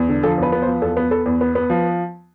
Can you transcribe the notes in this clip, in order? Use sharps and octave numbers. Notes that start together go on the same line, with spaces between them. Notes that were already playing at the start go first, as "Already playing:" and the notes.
Already playing: E2
D3
F3 A4
E2 B4
B3
C5
F3
E2 A4
B3
B3 A4
E2
B3
B3
F3